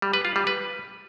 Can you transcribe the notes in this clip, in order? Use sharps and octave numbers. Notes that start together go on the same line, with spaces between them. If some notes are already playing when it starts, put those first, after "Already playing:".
G3
B4
F4
G3
B4